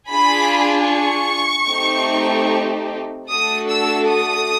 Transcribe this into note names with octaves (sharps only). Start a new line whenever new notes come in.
D4 F4 G#4 B5
C#6
A3 C4 D#4 G4
A3 D4 F#4 A4 D#6
E6
D#6